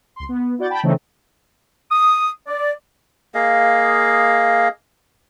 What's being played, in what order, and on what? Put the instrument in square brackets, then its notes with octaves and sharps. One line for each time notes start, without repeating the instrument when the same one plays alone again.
[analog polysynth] C#2 C6
B3
E4 F#4 D5 F#5 G6 A6
G5 A5 B5
C#3 E3 A3 C4 C#4 D#4
[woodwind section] D#6
D5
[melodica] A#3 G#4 D#5 F5